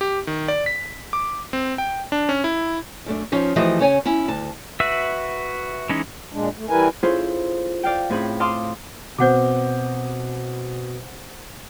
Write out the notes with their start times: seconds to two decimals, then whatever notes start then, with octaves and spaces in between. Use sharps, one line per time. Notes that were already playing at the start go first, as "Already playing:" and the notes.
0.01 G4
0.27 D#3
0.48 D5
0.66 B6
1.13 D6
1.53 C4
1.78 G5
2.12 D4
2.29 C#4
2.44 E4
3.06 F#2 A3 D4
3.32 F3 C#4 D#4
3.56 E3 F3 A3 F#4 G4 D#5
3.79 C#3 C#4 C#5 G#5
4.05 C#4 E4
4.28 D2 A5
4.80 F#4 B4 E5 E6
5.89 E3 G#3 C#4 D#4
6.33 A#2 G#3 D4
6.57 A3
6.69 E3 G3 E4 A#4 B4 G#5
7.03 C#4 E4 F4 G#4 A4 C5
7.83 D5 F5 G5
8.10 A2 C4 C#4 G#4 B5
8.40 F5 A5 C6 D6 D#6
9.18 B2 C4 C5 F#5 D6 G6